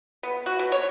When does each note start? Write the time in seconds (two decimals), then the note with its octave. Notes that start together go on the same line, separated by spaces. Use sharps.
0.23 B3
0.46 F#4
0.59 B2
0.72 C#5